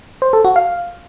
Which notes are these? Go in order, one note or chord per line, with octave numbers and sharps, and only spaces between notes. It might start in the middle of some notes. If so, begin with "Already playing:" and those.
C5
A4
F#4
F5